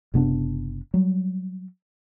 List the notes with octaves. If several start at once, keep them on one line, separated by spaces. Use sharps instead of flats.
F#1 C3 B3 D4
F#3 G3